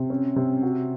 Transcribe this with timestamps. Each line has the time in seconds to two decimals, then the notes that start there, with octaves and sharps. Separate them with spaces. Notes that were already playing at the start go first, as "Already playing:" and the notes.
Already playing: C3
0.10 C#4
0.36 C3
0.63 F#4